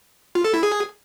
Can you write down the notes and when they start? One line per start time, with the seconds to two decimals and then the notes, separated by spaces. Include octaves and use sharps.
0.35 F4
0.44 A4
0.54 E4
0.63 G#4